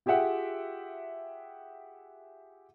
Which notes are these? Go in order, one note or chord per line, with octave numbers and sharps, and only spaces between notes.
F4 G4 G#4 E5 F#5 G5